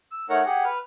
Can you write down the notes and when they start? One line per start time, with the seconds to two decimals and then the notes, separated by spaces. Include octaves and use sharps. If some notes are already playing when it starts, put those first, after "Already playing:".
0.11 E6
0.29 A3 D#4 A#4 C#5 F#5
0.45 G4 G#4 F#5
0.64 B4 F6